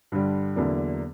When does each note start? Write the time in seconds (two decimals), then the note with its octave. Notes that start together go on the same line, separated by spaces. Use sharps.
0.12 G2 D3 G3
0.56 E2 D3 F#3 A#3 D4